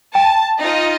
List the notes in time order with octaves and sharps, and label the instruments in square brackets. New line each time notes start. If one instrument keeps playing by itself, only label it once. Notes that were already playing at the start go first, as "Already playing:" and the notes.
[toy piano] G5 [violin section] A5
[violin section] D#4 F4 D#5